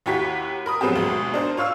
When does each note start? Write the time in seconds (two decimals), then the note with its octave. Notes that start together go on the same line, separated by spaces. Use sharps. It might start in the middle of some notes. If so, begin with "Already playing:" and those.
0.06 D#2 E4 F#4 G4 B6
0.66 A#4 B5 D#6
0.81 F3 F#3 G#3 B3 C4 G4
0.96 D2 B2 G#3
1.34 D4 D#4 A#4 C5
1.57 F4 C#5 F5 E6